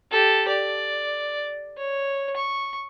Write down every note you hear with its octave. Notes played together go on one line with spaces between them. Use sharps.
G4 A4
D5
C#5
C#6